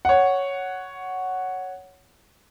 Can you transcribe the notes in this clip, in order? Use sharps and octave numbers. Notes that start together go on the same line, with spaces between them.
C#5 F#5